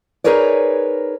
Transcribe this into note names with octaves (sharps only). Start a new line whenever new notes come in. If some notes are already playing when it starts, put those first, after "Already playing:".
D#4 G#4 A#4 B4 C#5 D5